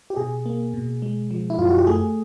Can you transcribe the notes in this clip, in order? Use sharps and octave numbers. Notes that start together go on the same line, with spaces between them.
G4
B2 G#4
A#3
B2
G#3
F3
E4
F#2 F4
F#4
G4
A3 G#4